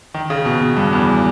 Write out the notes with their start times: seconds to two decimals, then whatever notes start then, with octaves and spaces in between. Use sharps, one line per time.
0.14 D#3
0.30 C#3
0.45 B2
0.61 B2
0.77 G2
0.93 E2